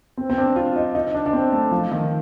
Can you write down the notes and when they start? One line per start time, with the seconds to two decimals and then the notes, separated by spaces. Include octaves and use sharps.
0.17 C4
0.30 C4
0.38 D4
0.56 F4
0.76 D#4
0.95 D#4
1.14 D4
1.26 D4
1.33 C4
1.52 A3
1.71 F3
1.91 D#3